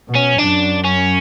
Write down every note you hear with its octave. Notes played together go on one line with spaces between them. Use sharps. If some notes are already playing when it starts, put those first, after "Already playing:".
B2
C#4
F#2 D4
C#4